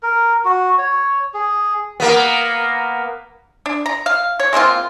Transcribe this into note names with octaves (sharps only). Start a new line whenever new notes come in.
A#4
F#4
C#5
G#4
A#3 B3
D4
A#5
F5
C#5
G#3 A#3 C4 F4